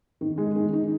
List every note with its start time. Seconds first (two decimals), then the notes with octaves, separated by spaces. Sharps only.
0.21 D#3
0.38 G#3
0.55 D#3
0.73 D#4